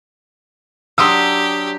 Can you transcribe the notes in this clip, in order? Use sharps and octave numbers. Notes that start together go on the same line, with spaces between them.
F#3 D4 G4 C6 D#6 E6